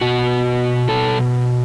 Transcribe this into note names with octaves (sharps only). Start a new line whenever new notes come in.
B2 F#4
B2 A4